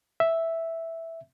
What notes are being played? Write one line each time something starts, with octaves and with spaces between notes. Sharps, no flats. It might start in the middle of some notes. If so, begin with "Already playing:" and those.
E5